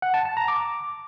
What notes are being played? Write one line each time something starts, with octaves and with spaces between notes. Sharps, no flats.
F#5
A5
A5
A#5
D6